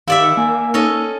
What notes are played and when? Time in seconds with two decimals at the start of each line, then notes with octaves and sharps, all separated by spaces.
0.08 D#3 E4 G4 D5 E5 F5
0.23 C#7
0.37 A#3 G#5 E6
0.74 C#4 D#4 A4 D#5